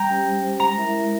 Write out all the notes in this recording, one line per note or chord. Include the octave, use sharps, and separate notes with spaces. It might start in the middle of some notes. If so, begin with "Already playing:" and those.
Already playing: G3 G5 A#5
C#4 G4 C5
G3
C#4 G4 C5
G#3 A#5
E4 A#4 E5
G#3